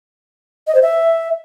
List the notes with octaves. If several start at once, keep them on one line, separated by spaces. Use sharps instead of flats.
D#5
C5
E5